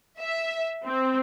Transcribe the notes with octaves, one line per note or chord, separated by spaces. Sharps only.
E5
C4